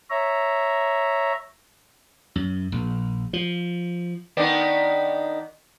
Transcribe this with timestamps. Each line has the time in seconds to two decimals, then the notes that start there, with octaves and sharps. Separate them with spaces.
0.10 C#5 E5 A#5
2.36 F#2
2.72 A#1
3.33 F3
4.37 D#3 B3 D4